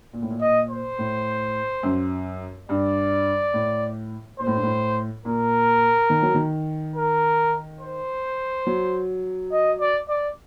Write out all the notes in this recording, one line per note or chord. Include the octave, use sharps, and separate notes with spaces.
A#2
A2
A#2
D#5
C5
A2
F#2
G2 D5
A2
A#2 C5
A2
G2
A2
A#2 A#4
D#3
F#3
D#3
A#4
C5
F#3
D#5
D5
D5